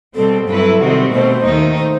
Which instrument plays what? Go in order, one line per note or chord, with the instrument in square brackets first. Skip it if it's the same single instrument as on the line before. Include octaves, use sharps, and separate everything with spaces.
[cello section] B2 G3 C4 [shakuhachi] A4
[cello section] G2 F#3 C4 E4 B4 [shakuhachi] A4
[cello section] C3 D#3 G3 C4 F#4
[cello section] B2 A3 C4 [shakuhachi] C5
[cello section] D#2 D#3 A3 D#4
[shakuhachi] C5